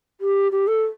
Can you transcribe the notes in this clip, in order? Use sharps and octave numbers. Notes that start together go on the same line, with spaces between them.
G4
G4
A4